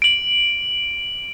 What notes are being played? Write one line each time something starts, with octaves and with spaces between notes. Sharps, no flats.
D7 F#7